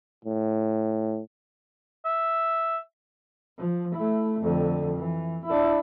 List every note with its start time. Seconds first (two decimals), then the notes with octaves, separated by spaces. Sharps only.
0.25 A2
2.05 E5
3.58 F3
3.96 A3 E4
4.40 F2 D3
4.97 E3
5.46 D4 E4